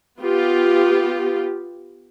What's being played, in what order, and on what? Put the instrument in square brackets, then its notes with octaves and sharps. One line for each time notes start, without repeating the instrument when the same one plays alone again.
[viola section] B3 F4 G4